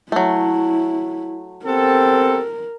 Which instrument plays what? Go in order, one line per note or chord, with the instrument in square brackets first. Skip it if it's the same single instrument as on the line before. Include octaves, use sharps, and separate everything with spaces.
[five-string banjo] F#3 A3 [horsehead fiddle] E4
[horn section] B3 G4 A4 [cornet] C4 [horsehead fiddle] A#4